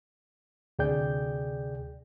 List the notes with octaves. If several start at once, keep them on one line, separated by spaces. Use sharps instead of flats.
D2 C3 G#4 D5 G5 G6